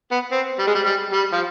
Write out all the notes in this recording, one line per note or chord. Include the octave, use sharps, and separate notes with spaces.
B3
C4
G3
G#3
G3
G3
G3
F3